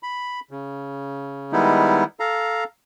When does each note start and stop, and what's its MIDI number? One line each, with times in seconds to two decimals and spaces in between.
0.03 0.40 83
0.51 1.52 49
1.52 2.04 51
1.52 2.04 55
1.52 2.04 56
1.52 2.04 59
1.52 2.04 63
1.52 2.04 64
2.20 2.64 69
2.20 2.64 77
2.20 2.64 82